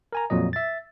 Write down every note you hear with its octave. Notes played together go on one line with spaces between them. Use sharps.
A#4 G#5 A#5
F2 A#2 F#3 D#5
E5 A6